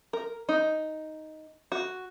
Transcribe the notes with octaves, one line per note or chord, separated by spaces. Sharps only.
A#4
D#4
F#4